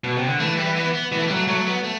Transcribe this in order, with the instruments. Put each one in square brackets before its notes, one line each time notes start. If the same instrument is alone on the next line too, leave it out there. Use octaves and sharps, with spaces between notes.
[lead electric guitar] B2
C3
D3
[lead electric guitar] E3 [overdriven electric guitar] A3
[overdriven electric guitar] G3
B3
B3
[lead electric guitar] E3 [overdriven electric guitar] B3
[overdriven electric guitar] A3
G3
[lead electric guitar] F#3 [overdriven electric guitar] A3
[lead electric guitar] F#3 [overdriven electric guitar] A3
[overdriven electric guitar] B3
A3